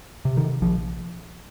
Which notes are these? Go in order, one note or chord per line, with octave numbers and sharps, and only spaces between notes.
C3
D#3
A#1 F3